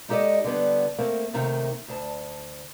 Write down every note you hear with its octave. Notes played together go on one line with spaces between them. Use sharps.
G#3 D#4 G4 A4 D5 D#5
D3 G3 B3 D4
A3 A#3 C4
D#2 C3 D#3 A3
D2 A5